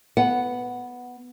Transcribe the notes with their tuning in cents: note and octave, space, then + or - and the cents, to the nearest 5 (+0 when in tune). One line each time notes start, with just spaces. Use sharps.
B3 +0 F#5 +0